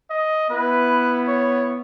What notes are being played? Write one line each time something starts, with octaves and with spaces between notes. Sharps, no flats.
D#5
B3 E4 B4
C#5